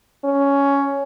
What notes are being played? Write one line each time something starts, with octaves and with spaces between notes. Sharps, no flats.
C#4